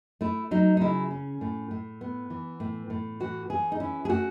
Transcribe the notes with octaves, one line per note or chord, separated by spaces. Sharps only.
A3 E4
F#3 D#4
D#4
C#3 E4
C#4
A2
A2
B3
E3
A2
A2
E3 F#4
E3 G#4
D#4
C#4 E4
G#4
A3 F#4